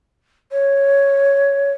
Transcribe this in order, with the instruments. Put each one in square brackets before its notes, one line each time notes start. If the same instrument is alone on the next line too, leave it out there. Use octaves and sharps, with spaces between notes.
[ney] C#5